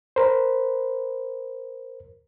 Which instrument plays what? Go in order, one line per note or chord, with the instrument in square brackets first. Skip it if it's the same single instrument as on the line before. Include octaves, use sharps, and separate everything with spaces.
[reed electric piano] A#4 C5